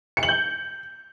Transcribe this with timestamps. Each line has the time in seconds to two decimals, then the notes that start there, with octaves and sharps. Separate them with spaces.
0.17 C#7
0.23 F#7
0.29 G6